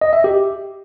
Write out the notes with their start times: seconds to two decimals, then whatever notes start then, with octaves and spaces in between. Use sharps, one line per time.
0.01 D#5
0.13 E5
0.24 G4